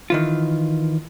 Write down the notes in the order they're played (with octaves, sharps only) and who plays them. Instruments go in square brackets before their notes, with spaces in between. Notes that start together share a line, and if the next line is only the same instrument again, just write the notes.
[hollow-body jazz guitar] D#3 E3 F4